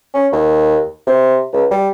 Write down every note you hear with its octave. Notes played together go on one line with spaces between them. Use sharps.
C#4
D#2
C3
C#2
G3